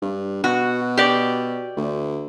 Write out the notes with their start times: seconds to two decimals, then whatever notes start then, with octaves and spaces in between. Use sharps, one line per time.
0.02 G2
0.44 B2 F#4
0.97 G4 D5
1.77 D2